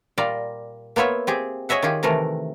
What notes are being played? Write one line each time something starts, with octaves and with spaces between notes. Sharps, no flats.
A#2 G3 F4 D5 A#5
A#3 B3 F4 C#5 E5
C4 G4 G#4
G#4 C#5 D#5 E5 F#5
D#3 F4 G4 G#4
C3 D#3 E3 A3 A#4